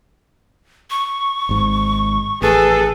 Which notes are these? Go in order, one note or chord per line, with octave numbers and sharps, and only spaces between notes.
C#6
G#1 G#2
A1 G#4 A4 B4